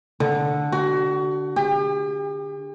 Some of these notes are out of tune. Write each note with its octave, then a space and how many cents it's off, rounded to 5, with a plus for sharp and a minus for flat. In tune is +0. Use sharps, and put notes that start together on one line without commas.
D3 -5
F#4 +30
G4 +45